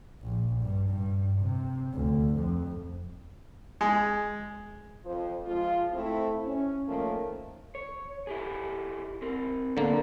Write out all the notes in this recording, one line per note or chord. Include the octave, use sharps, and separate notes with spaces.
A#1
G2
G2
C3
D2
F2
G#3
F2 F3 F4 C5
F3 G#3 F4
A3 C4 E4
C#4
D#3 F3 A3 A#3 C#4
C#5
E4 G4 G#4
C4 A#4
D3 E3 F#3 A#3 B3